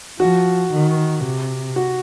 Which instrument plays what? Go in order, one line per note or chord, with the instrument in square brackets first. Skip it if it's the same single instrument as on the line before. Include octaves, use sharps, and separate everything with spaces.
[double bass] F3 [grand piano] F#4
[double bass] D#3
C3
[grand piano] F#4